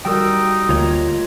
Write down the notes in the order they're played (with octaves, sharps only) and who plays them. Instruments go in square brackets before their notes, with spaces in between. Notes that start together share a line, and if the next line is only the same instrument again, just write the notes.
[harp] G3 F#4 A#4 [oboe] D#4 [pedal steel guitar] G5 E6
[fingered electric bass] D2 [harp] A#3 [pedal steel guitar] F4 C#5 D#5